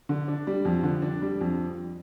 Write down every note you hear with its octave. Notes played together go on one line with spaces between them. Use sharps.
D3
D4
G3
F2
D3
D4
G3
F2